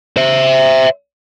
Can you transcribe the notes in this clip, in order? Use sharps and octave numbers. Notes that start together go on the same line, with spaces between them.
C5 E5